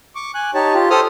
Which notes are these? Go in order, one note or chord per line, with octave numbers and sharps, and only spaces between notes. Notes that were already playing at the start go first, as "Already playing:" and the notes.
C#6 D6
G#5 F#6
D#4 G4 C#5 A5
F4 G4
G4 A4 C5 D#6 F6